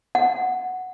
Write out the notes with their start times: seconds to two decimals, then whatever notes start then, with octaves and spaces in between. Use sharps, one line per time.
0.15 F#5